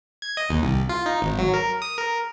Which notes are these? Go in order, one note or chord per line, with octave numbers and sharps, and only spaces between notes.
G#6
D#5
D#2
C2
F4
D#4
G#1
F#3
A#4
D#6
A#4